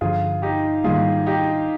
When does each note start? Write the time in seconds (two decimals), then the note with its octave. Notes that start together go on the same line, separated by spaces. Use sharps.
0.01 G2 D3 F3 F4 G#4
0.42 D#4 G4
0.84 G#2 D#3 G3 A#3 F4 G#4
1.26 D#4 G4